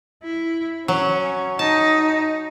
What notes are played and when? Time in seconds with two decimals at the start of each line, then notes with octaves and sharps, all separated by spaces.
0.23 E4
0.88 F#3 C#4
1.59 D#4 A5